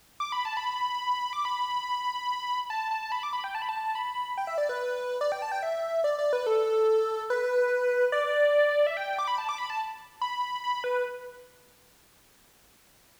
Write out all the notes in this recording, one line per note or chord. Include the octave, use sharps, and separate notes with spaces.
D6
B5
A5
B5
D6
B5
A5
A5
A5
B5
D6
B5
G5
A5
B5
A5
B5
G5
E5
D5
B4
D5
G5
A5
G5
E5
D5
D5
B4
A4
B4
D5
E5
G5
D6
B5
A5
D6
B5
A5
B5
B5
B4